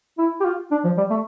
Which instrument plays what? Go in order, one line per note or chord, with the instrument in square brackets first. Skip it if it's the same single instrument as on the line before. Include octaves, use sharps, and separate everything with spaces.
[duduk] E4
G4
F4
D4
F3
G3
A3